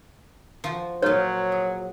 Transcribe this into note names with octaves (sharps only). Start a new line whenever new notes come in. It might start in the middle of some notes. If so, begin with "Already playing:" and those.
F3 F#4
A#2 F#3 F4 C#5
G#4